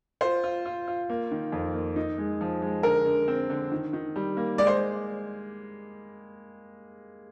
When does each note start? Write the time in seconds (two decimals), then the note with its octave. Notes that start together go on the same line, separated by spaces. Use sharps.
0.21 F4 C5
0.44 F4
0.66 F4
0.88 F4
1.10 A#3
1.31 D#3
1.52 F2
1.74 A#3
1.96 D#4
2.18 G#3
2.41 F3
2.62 G#3
2.83 D3 A#4
3.05 D3
3.28 C4
3.50 D3
3.72 D#3
3.93 D#3
4.16 G3
4.37 A#3
4.58 G#3 D5
4.67 C5